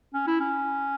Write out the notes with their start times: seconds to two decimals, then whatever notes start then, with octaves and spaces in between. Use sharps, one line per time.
0.14 C#4
0.27 E4
0.40 C#4